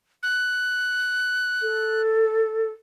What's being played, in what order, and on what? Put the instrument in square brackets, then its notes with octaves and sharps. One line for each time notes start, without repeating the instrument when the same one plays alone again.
[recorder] F#6
[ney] A4